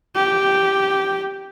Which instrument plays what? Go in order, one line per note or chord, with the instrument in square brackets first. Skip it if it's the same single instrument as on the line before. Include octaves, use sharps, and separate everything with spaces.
[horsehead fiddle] G4